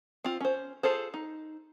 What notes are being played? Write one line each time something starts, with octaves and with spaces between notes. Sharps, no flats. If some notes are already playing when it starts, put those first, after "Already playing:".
C4 F4
C#4 C5
F4 G#4 A4 C5
D#4